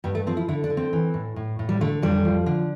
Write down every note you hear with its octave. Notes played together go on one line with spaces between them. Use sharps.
G2 G3
A3
F3 C4
E4
D3 E4
D4
D3
C4
E3
A2
A2
A2
G3
D3 A3
F2 G3
F3
D3